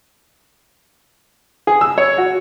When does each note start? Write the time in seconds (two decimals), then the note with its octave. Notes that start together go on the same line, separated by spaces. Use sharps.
1.67 G#4
1.81 E6
1.98 C#5
2.18 F#4